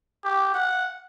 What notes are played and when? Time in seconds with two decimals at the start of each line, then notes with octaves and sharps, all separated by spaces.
0.24 G4
0.54 F#5